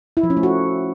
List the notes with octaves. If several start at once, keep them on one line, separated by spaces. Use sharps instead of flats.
E4
F3
C#4
A3
F#4